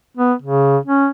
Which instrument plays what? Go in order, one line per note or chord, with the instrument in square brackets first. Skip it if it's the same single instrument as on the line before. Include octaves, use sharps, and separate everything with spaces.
[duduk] B3
C#3
C#4